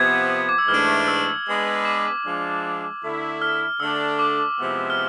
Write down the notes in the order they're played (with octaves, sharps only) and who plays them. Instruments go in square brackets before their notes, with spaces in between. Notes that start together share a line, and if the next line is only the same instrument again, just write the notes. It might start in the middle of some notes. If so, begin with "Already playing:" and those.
Already playing: [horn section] C3 F3 B3 [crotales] G#6
[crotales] D6
E6
[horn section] G#2 E3 A3 D4 [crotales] F6
[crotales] E6
[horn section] G#3 B3 D4 G#4 B4
[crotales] D6
[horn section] F3 G#3 D4
D3 A3 E4
[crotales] F6
[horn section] D3 A3 D4 A4 [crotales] E6
[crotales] D6
[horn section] C3 F3 G#3 B3 E4
[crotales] F6